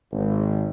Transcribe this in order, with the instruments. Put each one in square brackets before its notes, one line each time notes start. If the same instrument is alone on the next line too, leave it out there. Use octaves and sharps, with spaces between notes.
[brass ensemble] G#1